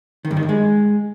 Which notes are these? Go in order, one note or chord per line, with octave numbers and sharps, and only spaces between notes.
D#3
G2
D#3
G2
G#3